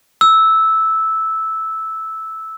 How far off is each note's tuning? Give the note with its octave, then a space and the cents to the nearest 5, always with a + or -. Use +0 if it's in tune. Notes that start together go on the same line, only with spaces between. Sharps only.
E6 -10